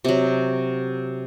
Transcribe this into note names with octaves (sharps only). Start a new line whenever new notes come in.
C3 F#3